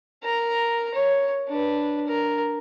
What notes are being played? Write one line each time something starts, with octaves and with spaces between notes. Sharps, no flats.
A#4 A#5
C#5
D4 B4
A#4